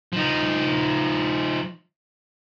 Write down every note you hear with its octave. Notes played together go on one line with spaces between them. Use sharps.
F3 D#4